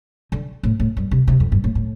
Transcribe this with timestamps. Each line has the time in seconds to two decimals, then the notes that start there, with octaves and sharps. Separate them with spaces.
0.32 D3
0.63 A2
0.80 A2
0.97 G2
1.11 C3
1.27 C3
1.40 F2
1.52 G2
1.64 A2
1.75 A2